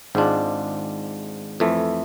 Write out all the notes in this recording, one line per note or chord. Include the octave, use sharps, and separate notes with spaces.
G#1 G#2 G#3 D4 F4
F2 E3 A3